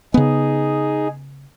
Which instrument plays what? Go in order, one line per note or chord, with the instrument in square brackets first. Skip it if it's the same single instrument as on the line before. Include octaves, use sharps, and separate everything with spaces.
[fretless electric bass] C#3 B3 [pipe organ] D#4 G#4